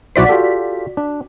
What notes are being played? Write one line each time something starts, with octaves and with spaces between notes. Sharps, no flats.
B1 E4 F#4 C5 D5 B6
F4 G4 A4
D4